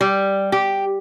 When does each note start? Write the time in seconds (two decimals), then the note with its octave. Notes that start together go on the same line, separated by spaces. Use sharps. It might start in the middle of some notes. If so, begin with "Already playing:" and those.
0.01 G3
0.52 G4